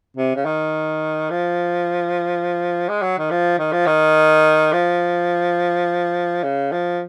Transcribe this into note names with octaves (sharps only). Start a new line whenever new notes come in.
C3
C#3
D#3
F3
G#3
F#3
D#3
F3
D#3
F3
D#3
F3
C#3
F3